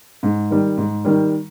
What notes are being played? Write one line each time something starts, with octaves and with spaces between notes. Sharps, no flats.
G#2
D#3 G3
G#2
D#3 G3